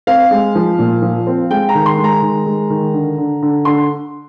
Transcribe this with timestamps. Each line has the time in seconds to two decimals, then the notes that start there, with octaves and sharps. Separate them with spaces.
0.07 C4 F5
0.31 G#3
0.55 F3
0.79 A#2
1.02 F3
1.27 C4
1.50 G#3 G5
1.69 A#5
1.75 D#3
1.86 C6
1.98 G#3
2.04 A#5
2.22 D#3
2.46 G#3
2.70 D#3
2.93 D3
3.18 D3
3.42 D3
3.65 D3 C6